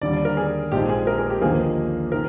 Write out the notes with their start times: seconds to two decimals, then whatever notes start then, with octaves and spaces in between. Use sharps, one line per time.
0.01 D#2 D3 G3 D5
0.13 D5
0.25 A#4
0.37 G#4
0.71 A#1 A#2 G#3 C4 D#4 G4
0.89 G#4
1.07 A#4
1.18 G#4
1.30 G4
1.41 D#2 D3 F3 A#3 D#4 G#4
2.12 D#3 A#4